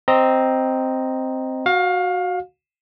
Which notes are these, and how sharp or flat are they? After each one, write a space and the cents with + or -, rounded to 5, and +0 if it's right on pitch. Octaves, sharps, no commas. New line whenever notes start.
C4 +0 D#5 +0 A#5 +0
F#4 -5 F5 +25